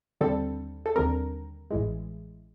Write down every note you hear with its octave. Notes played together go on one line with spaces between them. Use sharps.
D#2 D3 G3 C4 A4
A4
D#2 D3 G3 C4 A#4
A1 A2 E3 G#3